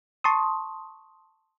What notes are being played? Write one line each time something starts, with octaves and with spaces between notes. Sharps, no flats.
A5 C6 C#6 D#6